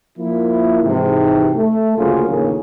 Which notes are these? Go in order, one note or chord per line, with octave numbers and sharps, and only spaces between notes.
F3 A#3 E4
G#2 C3 E3
A3
D2 C#3 F#3 A#3 F4 G#4
A#1 D#2 A2 C#3 A#3 C#4